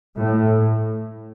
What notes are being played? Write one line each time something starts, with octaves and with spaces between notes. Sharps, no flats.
A2